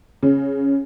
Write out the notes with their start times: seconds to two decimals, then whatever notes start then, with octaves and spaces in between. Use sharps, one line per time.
0.23 C#3